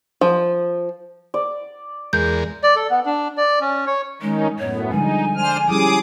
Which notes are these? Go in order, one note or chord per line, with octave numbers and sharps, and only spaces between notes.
F3
D5
E2 G#3 A#4 G6
D5
A4
B3
D4
D5
C#4
C#5
D#3 G#3 C#4 D#4
F#2 A2 B3 C#5
D3 F3 G3 G#3 D#4 G#5
D4 C5 F6
F3 G3 C#4 E4 G#4 D6 D#6